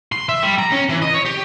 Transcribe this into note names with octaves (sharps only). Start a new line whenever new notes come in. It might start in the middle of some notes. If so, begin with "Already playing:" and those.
C6
E5
G3
A#5
C#4
E3
D#5
C#5
G4